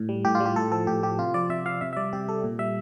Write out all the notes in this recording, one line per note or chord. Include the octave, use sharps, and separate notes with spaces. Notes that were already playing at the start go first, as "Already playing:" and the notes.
Already playing: A2
G3
A2 G4
F4
G3
G4
A2 A4
F3 A4
A2 G4
F3 G4
C3 F4
F3 D5
C3 E5
F3 F5
C3 E5
E5
G3 D5
C3 G4
G3 A4
A#2
G3 E5